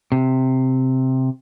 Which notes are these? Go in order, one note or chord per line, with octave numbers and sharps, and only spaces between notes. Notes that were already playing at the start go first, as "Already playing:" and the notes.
C3